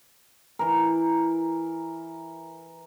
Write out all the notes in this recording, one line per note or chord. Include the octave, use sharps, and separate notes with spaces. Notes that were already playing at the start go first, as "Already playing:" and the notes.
E3 A#4